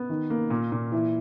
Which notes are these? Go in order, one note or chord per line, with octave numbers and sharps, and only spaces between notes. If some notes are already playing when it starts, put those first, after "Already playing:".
Already playing: B3
D#3
A#3
A#2
A#2
E3